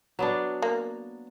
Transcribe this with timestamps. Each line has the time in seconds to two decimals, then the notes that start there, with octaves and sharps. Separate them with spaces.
0.19 F#3 B3 D4
0.62 A#3